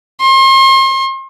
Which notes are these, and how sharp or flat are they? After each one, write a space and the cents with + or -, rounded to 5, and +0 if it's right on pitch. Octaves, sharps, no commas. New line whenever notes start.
C6 +40